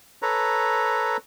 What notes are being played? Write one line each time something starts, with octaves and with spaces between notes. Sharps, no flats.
A4 B4 C#5 A#5